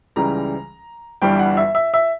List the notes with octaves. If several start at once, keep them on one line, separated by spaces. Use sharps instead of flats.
C#2 C#3 E3 G3 A#5
G1 G2 E3 G3 G5
F#5
E5
E5
E5